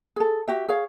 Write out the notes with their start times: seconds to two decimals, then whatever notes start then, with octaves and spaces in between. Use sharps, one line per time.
0.16 G#4 A4
0.48 F#4 G4 E5
0.68 G#4 C#5 F5